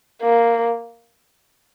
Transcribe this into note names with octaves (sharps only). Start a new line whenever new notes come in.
A#3